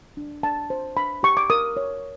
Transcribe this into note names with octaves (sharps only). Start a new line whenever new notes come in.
D4
D4 A5
C5
D4 B5
G4 C#6
D6
A#4 D#6
C#5